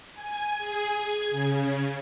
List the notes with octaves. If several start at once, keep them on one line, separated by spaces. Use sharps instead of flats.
G#5
G#4
G#6
C#3